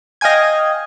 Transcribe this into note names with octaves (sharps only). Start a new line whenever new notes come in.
D#5 F5 G5 G#5 G#6